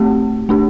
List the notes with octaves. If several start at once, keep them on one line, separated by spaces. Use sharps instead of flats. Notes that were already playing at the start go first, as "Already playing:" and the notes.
Already playing: A3 C4 G4
A3 D4 G4